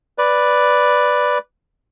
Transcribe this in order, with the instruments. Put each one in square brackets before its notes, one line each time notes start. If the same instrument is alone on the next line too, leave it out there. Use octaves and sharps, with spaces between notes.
[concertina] B4 D5